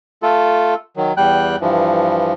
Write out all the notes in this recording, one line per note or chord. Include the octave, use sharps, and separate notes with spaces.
A3 F4 A4
D#3 F#3
E2 G3 G5 F#6
G2 E3 F3